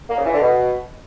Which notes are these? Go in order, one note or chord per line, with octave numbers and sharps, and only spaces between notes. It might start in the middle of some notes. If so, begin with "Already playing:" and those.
A#3
C#3
E3
D3
B2